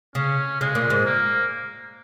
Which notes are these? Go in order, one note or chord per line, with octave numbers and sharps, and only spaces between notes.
C#3 C#4
C#3 G#3
A#2
G#2
A#3